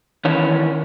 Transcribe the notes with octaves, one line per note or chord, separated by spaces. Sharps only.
D#3 E3 C#4 C#5